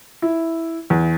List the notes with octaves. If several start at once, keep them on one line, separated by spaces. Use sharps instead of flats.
E4
E2